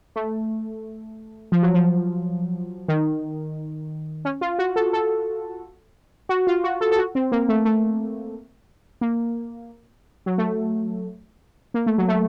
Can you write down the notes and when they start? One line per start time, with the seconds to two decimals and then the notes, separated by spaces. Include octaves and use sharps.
0.16 A3
1.52 F3
1.63 F#3
1.74 F3
2.88 D#3
4.25 C#4
4.41 F4
4.59 F#4
4.76 A4
4.93 A4
6.29 F#4
6.47 F4
6.64 F#4
6.81 A4
6.92 A4
6.98 F#4
7.15 C4
7.32 A#3
7.49 A3
7.65 A3
9.01 A#3
10.26 F#3
10.38 A3
11.74 A#3
11.86 A3
11.98 F#3
12.08 A3